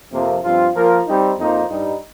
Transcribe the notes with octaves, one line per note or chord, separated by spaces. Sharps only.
F2 C3 F3 A#3
G2 F3 C4 F4
F3 A#3 F4 A#4
G3 C4 D#4
F2 F3 A#3 D#4 C5
G2 G3 D#4